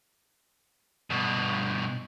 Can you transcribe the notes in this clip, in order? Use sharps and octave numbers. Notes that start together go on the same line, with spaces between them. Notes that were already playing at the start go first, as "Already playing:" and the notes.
G2 B2